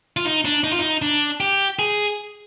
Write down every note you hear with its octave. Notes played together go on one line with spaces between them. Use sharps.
F4
D#4
D4
D#4
F4
D#4
D4
G4
G#4